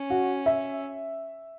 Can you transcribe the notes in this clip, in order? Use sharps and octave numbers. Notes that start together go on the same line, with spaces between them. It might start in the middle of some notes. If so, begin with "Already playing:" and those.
Already playing: C#4
F#4
E5